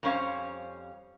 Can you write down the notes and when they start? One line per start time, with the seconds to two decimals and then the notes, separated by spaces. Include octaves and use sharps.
0.03 F2 G3 C#4 C5 F5